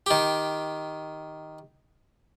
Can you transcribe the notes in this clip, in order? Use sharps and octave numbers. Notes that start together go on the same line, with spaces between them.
D#3 G4